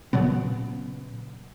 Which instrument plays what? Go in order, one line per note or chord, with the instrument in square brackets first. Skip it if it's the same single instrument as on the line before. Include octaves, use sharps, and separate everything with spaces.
[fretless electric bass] A#2 C#3 F#3 B3